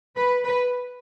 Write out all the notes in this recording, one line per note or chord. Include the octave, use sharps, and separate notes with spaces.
B4
B4